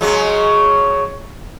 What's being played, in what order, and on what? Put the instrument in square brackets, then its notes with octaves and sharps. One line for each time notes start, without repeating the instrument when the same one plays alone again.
[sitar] C#3 F#3 G#3